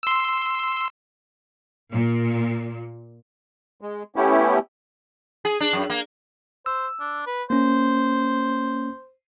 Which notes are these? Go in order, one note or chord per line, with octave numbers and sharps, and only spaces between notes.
C6 E6
A#2
G#3
A3 B3 C#4 E4 G4
G#4
D4
F#2
A#3
C5 E6
D4
B4
A#3 C#4 C5